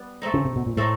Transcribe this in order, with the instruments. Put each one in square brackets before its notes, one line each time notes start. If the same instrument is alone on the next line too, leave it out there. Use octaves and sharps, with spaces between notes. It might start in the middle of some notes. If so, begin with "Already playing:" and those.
Already playing: [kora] G3 B3
A3 C4 D#4
[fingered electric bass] C#3
C3
B2
A#2
[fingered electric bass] A2 [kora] A3 C4 D#4